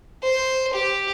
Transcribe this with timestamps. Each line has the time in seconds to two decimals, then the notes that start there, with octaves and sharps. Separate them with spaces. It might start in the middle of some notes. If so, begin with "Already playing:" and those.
0.23 C5
0.73 G4